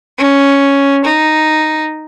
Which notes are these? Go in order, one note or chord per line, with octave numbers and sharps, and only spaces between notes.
C#4
D#4